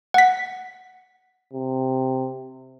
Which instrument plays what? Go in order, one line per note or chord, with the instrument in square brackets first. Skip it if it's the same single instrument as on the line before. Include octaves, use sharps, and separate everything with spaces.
[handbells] F#5 B6
[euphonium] C3